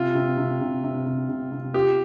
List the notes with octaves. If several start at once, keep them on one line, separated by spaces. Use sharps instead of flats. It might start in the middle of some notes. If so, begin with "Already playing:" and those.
Already playing: C3 F4
C3
C3
C3
C3
C3
C3
C3
F4 G4